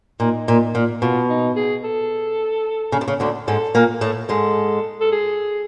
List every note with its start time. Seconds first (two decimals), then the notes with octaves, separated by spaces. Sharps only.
0.20 A#2 D#4
0.48 A#2
0.75 A#2
1.02 B2 F4
1.29 D#4
1.56 G#4
1.84 A4
2.92 C#3
3.01 C3
3.08 C#3
3.20 D2 D3
3.47 G#2 G#3 A4
3.75 A#2 A#3
4.01 A2 A3
4.29 G#2 G#3 A4
5.01 A4
5.11 G#4